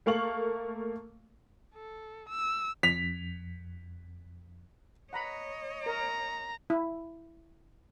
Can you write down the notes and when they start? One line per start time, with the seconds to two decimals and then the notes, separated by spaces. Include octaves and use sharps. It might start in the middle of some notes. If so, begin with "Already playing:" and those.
0.06 A3 A#3 F5 C#6 F#7
1.75 A4
2.29 E6
2.83 F2 B6 F7
5.13 C#5 D#5 F#5 A#5 B5
5.86 A#4 A#5
6.70 E4